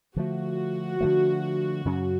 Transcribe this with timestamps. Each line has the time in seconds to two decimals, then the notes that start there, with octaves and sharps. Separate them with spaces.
0.16 D3 F3 A3 F#4
1.01 D3 F3 A3
1.85 F#2 C#3 F#3 C#4